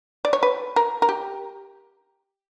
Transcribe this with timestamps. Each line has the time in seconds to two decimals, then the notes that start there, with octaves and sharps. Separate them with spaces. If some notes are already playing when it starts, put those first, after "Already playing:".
0.25 D5
0.33 C#5
0.43 B4
0.76 A#4
1.02 A#4
1.09 G4